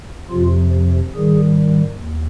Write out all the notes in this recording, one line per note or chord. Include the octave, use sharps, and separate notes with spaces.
F2 C3 F3 F4
G#2 D#3 G3 G#4
D#2